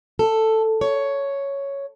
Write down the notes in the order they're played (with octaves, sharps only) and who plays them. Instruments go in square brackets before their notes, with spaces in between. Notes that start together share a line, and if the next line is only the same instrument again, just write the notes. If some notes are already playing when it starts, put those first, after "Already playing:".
[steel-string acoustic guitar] A4
C#5